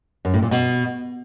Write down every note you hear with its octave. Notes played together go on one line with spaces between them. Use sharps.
F#2
A2
A#2
B2